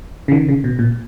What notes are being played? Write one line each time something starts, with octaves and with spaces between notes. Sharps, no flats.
C#3
D#3
C#3
B2
A#2